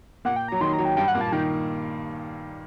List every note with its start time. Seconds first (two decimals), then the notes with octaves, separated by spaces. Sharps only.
0.25 A#2 A#3 F#5
0.36 G5
0.48 F#3 A#5
0.61 D#3 C6
0.73 A#5
0.78 F#3
0.85 G5
0.96 G2 G3 G5
1.08 F#5
1.14 A#2 A#3
1.21 A5
1.32 D#3 G5